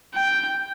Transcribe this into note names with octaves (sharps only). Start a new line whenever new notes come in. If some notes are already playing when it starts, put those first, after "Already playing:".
G5